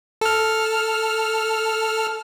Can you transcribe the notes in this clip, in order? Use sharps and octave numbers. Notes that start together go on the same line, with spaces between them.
A4 F6